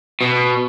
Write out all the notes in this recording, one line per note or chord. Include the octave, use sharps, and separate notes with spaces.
B2